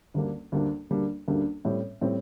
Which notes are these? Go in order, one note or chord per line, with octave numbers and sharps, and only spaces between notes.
D2 D3 G3 A#3 D4
D2 D3 G3 A#3 D4
D2 D3 G3 A#3 D4
D2 D3 G3 A#3 D4
A2 G3 C4
A2 G3 C4